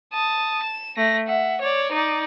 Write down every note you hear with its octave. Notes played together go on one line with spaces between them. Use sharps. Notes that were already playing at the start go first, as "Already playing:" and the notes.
A5 D#6
E7
A3 A#6
E5 F#5
C#5 D5
D#4 D5